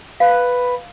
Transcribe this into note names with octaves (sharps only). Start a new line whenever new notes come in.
B4 F5